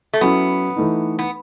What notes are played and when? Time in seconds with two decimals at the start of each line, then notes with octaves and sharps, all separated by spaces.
0.14 A3
0.21 F#3 B3 C#4 E4
0.76 E3 A3 D#4
1.19 B3